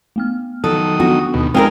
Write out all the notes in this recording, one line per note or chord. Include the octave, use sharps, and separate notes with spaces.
A3 B3 F6
D#3 F#3 A4 D#6
B3 C4 D4 F#4
D#2 B2
G#3 C4 D#4 G#4 A#4 F5